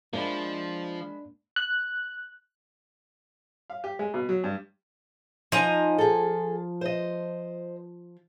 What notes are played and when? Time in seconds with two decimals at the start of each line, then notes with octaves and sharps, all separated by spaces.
0.13 F3 G#3 A#3 D4 D#5 E5 B5
1.56 F#6
3.70 F5
3.84 G4
3.99 G#3
4.14 B2
4.29 F#3
4.44 G2
5.52 F3 D#4 D#5 G#5 A#5
5.98 G#4 A4
6.81 C5 D#5